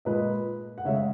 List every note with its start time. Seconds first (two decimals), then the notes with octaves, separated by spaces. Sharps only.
0.05 A#2 G#3 B4 D#5
0.78 F#5
0.85 C#3 C#5 E5
0.89 G#3